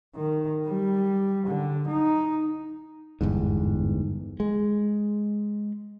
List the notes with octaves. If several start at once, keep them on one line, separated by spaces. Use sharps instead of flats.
D#3
G3
D3
D#4
G1 E2 G#2
G#3